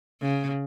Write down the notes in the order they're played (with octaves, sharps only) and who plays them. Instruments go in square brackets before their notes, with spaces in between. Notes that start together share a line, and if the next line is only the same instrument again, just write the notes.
[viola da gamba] C#3